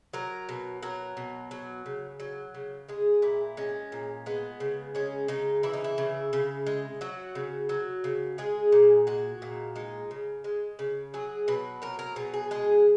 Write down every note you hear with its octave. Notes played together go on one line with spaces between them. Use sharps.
F#3 A#4
B2
F#3 A#4
B2
F#3
C#3
F#3
C#3
G#3 G#4
A#2 E4
G#3 C#4
A#2
G#3 B3
C#3
G#3 C#4
C#3 D#4
E3 E4
D#4
E4
C#3
C#3
G#3
F#3 F#4
C#3
F#3
C#3
G#3 G#4
A#2
G#3 F#4
A#2
G#3 D#4
C#3
G#3
C#3
F#3 G#4
B2 B4
F#3 A#4
A#4
B2 G#4
G#4
G#3 G#4